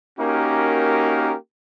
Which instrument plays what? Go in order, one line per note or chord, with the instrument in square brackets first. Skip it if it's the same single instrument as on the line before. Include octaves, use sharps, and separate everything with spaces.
[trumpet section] A#3 C#4 D#4 F#4 G4 A#4